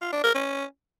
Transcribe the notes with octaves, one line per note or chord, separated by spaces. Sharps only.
F4
D4
A#4
C#4